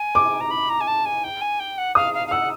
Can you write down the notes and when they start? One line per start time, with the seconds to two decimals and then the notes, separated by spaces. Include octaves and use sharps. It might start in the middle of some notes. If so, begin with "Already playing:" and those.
Already playing: G#5
0.15 D6
0.40 A#5
0.51 B5
0.70 A#5
0.81 G#5
0.87 A5
1.05 G#5
1.24 G5
1.41 G#5
1.60 G5
1.78 F#5
1.95 F5 D#6
2.14 F5
2.27 F5
2.31 F#5 E6